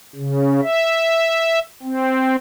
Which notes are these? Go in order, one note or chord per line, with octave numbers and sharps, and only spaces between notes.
C#3
E5
C4